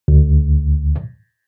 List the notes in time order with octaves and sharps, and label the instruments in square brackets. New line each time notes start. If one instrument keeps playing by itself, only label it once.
[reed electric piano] D2